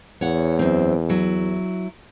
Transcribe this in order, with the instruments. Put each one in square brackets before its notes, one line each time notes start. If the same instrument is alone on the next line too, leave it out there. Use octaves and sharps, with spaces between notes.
[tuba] E2 [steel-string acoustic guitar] C#5 F#5
[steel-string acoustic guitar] F#2 C4
F#3 E4